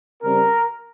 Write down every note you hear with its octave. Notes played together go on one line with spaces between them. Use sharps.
C#3 G3 C4 A#4